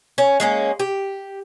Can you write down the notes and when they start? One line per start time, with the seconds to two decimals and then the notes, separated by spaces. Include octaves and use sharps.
0.18 C#4
0.40 G#3 A#3 C#4
0.80 G4